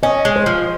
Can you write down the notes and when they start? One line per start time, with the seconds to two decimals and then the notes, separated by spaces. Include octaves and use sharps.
0.03 C#4 D#5
0.25 G#3
0.36 C5
0.46 F3